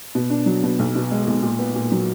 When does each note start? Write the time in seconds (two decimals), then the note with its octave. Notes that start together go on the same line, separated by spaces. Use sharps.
0.15 B2
0.30 D4
0.46 F#3
0.63 B2
0.79 B1
0.95 B2
1.11 G#3
1.27 B1
1.43 A#2
1.59 B3
1.75 A#2
1.92 F#3